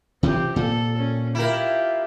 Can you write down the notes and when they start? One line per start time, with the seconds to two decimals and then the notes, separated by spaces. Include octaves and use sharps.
0.23 C3 E3 F3 C4 G4
0.56 A#2 A4
0.98 C#4
1.35 E4 F4 G4 A#4